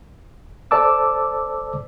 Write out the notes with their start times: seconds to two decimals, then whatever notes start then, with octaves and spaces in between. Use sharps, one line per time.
0.71 A4 C5 D5 A5 D6 E6